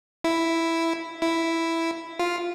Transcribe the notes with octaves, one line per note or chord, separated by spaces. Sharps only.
E4
E4
F4